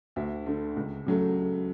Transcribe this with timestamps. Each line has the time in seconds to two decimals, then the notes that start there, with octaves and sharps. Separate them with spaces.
0.16 D2 E5
0.46 D3 A3
0.77 C#2
1.06 C#3 F#3 A3